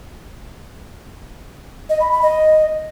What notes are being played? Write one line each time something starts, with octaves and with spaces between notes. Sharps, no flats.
D#5
B5
B5
D#5